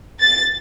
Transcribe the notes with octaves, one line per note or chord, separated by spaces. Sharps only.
A6